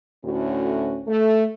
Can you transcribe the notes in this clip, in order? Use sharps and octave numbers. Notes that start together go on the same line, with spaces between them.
D2 A2 C#4 F#4
A3